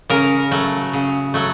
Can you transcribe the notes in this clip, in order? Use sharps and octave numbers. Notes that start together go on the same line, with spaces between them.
C#3 A#4
F#3 A3
C#3
F#3 A3